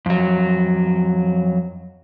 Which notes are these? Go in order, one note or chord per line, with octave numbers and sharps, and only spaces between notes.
F2 F#3